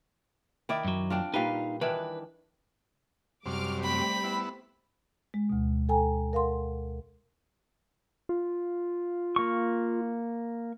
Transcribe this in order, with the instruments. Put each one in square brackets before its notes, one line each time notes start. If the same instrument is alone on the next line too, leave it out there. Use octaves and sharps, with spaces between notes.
[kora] D#3 E4 D5
[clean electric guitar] F#2 F#3
[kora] C4 D4 F4
[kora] A#2 G3 B4 [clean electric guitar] D#4 F5
[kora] D#3 E3 D4 [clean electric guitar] B4
[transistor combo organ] F#2 C3 [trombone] G3 [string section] D6 F6
[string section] A3 C4 G4 [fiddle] B5
[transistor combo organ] B3 E4
[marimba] G#3
D2 B2
A4 G5 G#5 A#5
A#4 F5 F#5 C6
[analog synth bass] F4
[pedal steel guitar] A#3 C#6